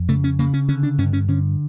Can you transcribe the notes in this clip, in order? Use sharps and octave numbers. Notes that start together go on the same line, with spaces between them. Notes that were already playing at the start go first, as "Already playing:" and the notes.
Already playing: F2
C#3 A3
C#4
C#3 A#3
C#4
D3 C#4
D4
G2 C#4
C#4
D3 C#4